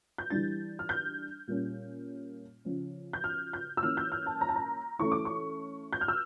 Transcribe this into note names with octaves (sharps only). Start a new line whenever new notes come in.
G6
E3 G3 D4 A6
F6
G6
A#2 G3 A#3 C#4
C#3 F3 C#4
G6
F6
G6
E6
E3 A#3 C#4 F6
G6
F6
A5
A#5
A5
A#5
E3 A3 C#4 C#6
D6
C#6
G6
F6
E6